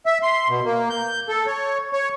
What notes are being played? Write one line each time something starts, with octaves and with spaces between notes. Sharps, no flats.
E5
C6
B2
A#3
G6
A4
C#5
C#5